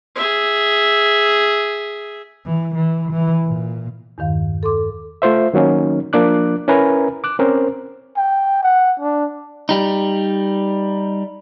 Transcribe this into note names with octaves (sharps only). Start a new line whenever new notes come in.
G#4 E5
E3
E3
E3
A#2
E2 G2 D#3 F5
A4 C6 D6
A3 F4 C5 E5
D#3 F#3 A#3 C#4 D#4
F3 A#3 D4 D6 F#6
C#4 E4 A#4 B4 G#5 A#5
D6 F#6
C4 C#4 A#4 C5
G5
F#5
D4
G3 D#4